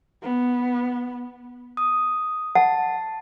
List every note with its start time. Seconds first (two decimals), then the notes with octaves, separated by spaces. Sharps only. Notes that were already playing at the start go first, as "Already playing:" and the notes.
0.22 B3
1.77 D#6
2.55 F#5 A5